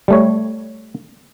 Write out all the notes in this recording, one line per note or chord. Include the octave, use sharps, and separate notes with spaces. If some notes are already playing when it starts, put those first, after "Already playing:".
G3 A3 C#5